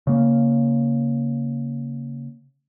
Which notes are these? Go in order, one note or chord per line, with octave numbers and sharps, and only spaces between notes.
C#3 A#3